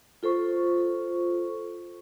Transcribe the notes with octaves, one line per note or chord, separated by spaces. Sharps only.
F4 A4 C5 C#6